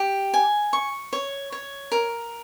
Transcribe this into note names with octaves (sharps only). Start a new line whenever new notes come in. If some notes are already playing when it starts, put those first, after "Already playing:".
Already playing: G4
G#5
C#6
C#5
C#5
A#4